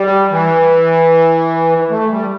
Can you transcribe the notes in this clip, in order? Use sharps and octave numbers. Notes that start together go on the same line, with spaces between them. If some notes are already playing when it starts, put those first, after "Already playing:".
Already playing: G3
E3
A3
G3